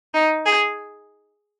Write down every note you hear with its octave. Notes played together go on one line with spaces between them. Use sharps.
D#4
G#4